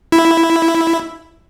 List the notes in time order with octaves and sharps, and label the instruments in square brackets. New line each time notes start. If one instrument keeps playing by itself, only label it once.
[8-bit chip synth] E4